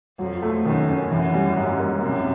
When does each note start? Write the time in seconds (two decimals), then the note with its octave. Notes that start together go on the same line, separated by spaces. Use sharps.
0.19 F2 F#3
0.42 A3
0.65 F#2 D#3
0.88 C#4
1.11 F#2 E3
1.34 G3
1.56 G#2
1.79 A#3
2.02 F#2 C3